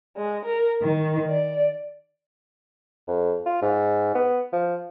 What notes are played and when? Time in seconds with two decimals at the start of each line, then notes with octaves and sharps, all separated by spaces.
0.16 G#3
0.44 A#4
0.82 D#3
1.29 D5
3.08 F2
3.46 F4
3.62 G#2
4.15 B3
4.53 F3